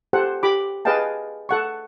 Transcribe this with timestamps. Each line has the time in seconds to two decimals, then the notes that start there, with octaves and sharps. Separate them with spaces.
0.13 G4 A4 C5 F#5
0.43 G4 B5 D6
0.85 G#4 B4 D#5 F5 G5 A5
1.49 A4 F#5 C#6